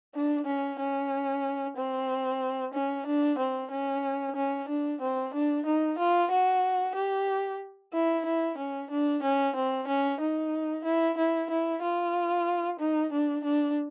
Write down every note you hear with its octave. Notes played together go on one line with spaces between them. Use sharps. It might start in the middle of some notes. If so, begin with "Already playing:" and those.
D4
C#4
C#4
C4
C#4
D4
C4
C#4
C#4
D4
C4
D4
D#4
F4
F#4
G4
E4
E4
C#4
D4
C#4
C4
C#4
D#4
E4
E4
E4
F4
D#4
D4
D4